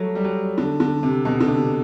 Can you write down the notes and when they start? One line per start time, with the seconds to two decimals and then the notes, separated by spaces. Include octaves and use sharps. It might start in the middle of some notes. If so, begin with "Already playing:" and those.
Already playing: F#3 G3 A3
0.15 G3
0.24 F#3
0.58 D3
0.80 D3
1.03 C3
1.25 B2
1.40 D3
1.47 C3